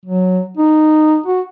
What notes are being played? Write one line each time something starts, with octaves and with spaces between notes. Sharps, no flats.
F#3
D#4
F#4